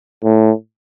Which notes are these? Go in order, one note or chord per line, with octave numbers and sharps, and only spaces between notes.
A2